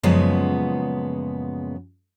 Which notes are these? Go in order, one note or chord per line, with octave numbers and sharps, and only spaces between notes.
F#2 A#2 C#3 F3 G#3 B3